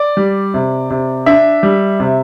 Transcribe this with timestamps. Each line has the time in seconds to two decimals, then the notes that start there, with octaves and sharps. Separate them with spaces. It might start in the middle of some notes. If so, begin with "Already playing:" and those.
Already playing: D5
0.17 G3
0.54 C3
0.90 C3
1.26 D4 E5
1.63 G3
2.00 C3